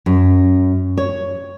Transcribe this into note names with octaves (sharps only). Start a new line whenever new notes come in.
F#2
C#5